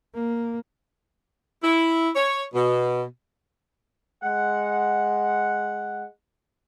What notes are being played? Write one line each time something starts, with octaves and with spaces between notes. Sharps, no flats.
A#3
E4
C#5
B2
G#3 F#5